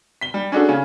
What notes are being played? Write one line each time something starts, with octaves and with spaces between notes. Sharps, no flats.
B6 G7
G3
C#4 D4 F#4 G#4 A4
C#3 C#4